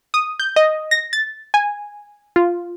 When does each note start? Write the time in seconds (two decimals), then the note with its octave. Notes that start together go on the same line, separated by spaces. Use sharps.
0.14 D#6
0.40 G6
0.56 D#5
0.91 A#6
1.13 A6
1.54 G#5
2.36 F4